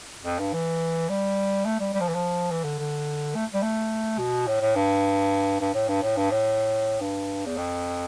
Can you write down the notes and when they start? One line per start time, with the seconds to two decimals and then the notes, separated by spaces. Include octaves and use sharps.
0.24 F2
0.39 G2
0.53 E3
1.09 G3
1.65 A3
1.80 G3
1.94 G3
2.01 F3
2.08 E3
2.14 F3
2.51 E3
2.64 D3
2.79 D3
3.35 A3
3.54 G3
3.62 A3
4.18 B2
4.47 A2
4.61 A2
4.75 G2
5.60 G2
5.74 A2
5.88 G2
6.02 A2
6.17 G2
6.31 A2
7.00 G2
7.46 E2
7.57 F2